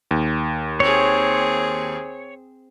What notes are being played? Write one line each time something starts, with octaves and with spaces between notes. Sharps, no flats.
D#2
C4 G#4 C#5